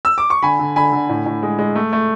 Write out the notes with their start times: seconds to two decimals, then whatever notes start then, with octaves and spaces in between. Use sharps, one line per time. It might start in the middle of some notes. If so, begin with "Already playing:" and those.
0.05 E6
0.18 D6
0.30 C#6
0.42 D3 G#5 B5
0.59 D3
0.76 D3 G#5 B5
0.92 D3
1.09 A2
1.26 A2
1.43 G#3
1.59 G#3
1.75 A3
1.93 A3